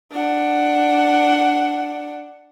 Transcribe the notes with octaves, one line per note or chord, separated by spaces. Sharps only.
D4 F#5